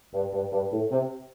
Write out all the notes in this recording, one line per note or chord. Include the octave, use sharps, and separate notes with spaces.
G2
G2
G2
A2
C3